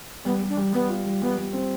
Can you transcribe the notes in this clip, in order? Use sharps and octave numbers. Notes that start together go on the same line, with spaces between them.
G3 B3
G3
D4
G3
G3 B3
F4
G3
G3 B3
G3
C4